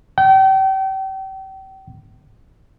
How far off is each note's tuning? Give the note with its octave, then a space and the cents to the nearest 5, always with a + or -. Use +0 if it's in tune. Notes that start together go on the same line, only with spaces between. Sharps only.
G5 -35